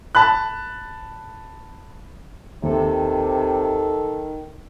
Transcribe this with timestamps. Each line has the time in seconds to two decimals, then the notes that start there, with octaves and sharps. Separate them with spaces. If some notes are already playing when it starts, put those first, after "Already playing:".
0.15 A5 B5 F#6
2.63 D#2 C3 D#3 A4